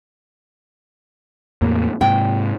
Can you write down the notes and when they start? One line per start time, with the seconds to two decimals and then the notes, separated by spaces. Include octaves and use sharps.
1.62 E2 A2 A#3
2.01 G#2 C3 G5